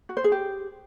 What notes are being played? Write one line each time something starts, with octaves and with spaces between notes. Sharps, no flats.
F#4
C5
G#4
G4